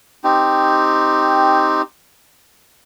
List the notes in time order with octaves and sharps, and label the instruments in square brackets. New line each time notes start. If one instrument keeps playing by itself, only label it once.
[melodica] C4 D#4 G4